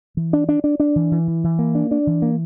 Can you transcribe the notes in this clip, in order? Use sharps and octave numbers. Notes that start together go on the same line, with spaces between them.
E3
D4
D4
D4
D4
E3
E3
E3
E3
A#3
D4
D4
E3
A#3